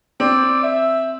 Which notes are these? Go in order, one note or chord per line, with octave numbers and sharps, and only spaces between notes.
C4 D5
E5